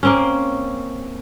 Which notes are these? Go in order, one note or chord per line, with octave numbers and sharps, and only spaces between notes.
A#3 C4 C#4